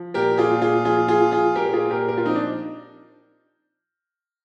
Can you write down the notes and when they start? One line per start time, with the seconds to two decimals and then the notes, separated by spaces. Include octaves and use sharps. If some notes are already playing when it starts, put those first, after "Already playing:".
Already playing: F3
0.14 A#2 G4 A#4
0.38 F4 G#4
0.50 A#2
0.62 F4 G#4
0.85 F3 F4 G#4
1.08 F4 G#4
1.21 F3
1.31 F4 G#4
1.55 A#2 G4 A#4
1.66 A#4
1.73 F4 G#4
1.90 A#2 G4 A#4
2.08 G4 A#4
2.17 F4
2.26 F3 C4 D#4
2.36 D4